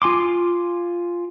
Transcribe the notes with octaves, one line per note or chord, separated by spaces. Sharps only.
F4 G#5 C6 D6